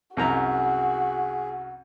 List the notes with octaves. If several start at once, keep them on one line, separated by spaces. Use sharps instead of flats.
C2 F#2 F#4 G#4 A#5